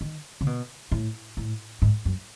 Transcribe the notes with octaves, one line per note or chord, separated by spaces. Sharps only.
D#3
C#3
B2
A2
A2
G#2
F#2